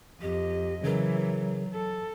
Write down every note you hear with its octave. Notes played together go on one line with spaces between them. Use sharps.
F2 G4 D#5
C#3 E3 F#3 G#4 A#4
A4